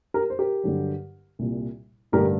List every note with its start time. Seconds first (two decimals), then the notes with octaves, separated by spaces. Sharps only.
0.14 G4 A#4
0.30 C5
0.39 G4 A#4
0.64 G2 D3 F#3
1.39 C2 A#2 G3
2.12 A1 G2 D3 A3 G4 A#4